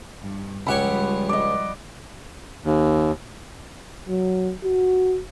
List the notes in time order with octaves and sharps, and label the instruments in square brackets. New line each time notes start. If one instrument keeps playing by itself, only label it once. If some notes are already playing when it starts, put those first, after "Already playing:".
[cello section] G2
[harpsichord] C#2 G4 C#5 [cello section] F3 G3 [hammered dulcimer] F#5 B5
[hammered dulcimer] D5 D#5
[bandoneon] D#2
[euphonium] F#3
F#4